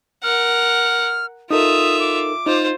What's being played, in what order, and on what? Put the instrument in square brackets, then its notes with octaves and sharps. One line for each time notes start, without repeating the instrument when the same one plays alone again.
[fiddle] A#4 F#5 [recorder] F6
[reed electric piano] D#4 A4 A#4 [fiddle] F4 E5 [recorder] D#6
[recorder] D6
[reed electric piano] D#4 [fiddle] F4 C5